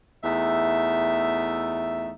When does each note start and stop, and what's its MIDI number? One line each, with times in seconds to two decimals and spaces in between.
0.24 2.12 40
0.24 2.12 57
0.24 2.12 63
0.24 2.12 76